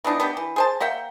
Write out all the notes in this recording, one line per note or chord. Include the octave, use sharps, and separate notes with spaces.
E3 B3 D4 D#4
B3 D4 G4
E3
G#4 C5 A5
A#3 E5 F#5 G5